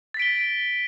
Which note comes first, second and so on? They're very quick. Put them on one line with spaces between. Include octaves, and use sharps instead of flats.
A6 B6 D7 G7